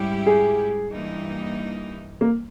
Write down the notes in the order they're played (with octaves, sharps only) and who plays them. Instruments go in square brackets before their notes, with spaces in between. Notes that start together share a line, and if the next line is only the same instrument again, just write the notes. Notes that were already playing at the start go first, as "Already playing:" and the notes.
Already playing: [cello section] G#2 G3 C#4 E4 G4
[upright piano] G#4
[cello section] G2 E3 A#3 D#4
[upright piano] A#3